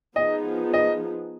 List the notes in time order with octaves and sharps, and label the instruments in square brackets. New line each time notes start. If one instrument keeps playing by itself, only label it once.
[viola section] F3 B3 D#4 G#4 [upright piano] D#5
[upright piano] D#5